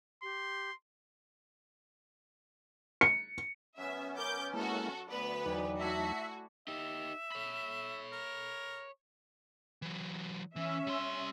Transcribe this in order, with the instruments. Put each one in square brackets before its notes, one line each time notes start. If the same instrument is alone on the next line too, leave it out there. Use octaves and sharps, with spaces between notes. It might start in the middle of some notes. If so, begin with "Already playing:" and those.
[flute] G4 [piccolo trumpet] C6
[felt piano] C#7
[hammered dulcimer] F#2 [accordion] B3 C#4 [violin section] E5
[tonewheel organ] A#4 [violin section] D6 G6
[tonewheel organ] G#3 A#3 E4 [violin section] F#4 A4
[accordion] D2 [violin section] B3 B4 [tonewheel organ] D5
[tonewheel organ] E2 F#3 D#4 [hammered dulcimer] D5 G5 G#5
[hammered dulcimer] A3 E4 A4 [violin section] F#4 [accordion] E5
[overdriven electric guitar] D#4 G4 [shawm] E5
[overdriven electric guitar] C#5 B5
[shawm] A#4
[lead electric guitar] E3 F#3
[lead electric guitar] E3 [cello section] C#4 E5
[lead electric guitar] G3 C6